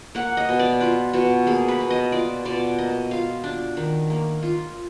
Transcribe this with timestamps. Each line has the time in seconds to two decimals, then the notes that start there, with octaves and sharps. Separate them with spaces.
0.15 A#3 F#5
0.37 D#5
0.49 B2
0.59 D5
0.81 F4 B4
1.13 B2 F#4
1.47 A#3 G#4
1.68 B4
1.80 B2
1.90 D#5
2.12 F4 D5
2.45 B2 D5
2.78 A#3 D#5
3.11 F4 F5
3.44 D4
3.77 D#3
4.10 A#3
4.43 F4